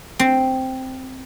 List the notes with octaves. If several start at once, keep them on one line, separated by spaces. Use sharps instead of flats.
C4